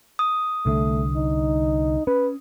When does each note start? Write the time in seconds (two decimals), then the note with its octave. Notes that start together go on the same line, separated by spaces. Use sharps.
0.19 D#6
0.66 C2 D3 A3
1.16 D#4
2.07 C#4 B4